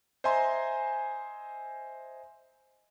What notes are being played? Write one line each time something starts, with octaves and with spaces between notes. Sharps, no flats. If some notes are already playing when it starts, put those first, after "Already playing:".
C5 D#5 E5 G#5 A#5 C6